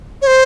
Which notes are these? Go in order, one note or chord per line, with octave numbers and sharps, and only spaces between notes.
C#5
C5